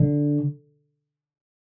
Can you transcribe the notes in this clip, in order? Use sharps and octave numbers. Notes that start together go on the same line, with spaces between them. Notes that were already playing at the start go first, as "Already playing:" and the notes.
Already playing: D3